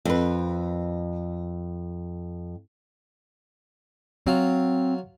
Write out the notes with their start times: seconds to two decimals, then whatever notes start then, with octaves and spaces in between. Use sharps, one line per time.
0.05 F2 B4
4.27 F#3 C4 F4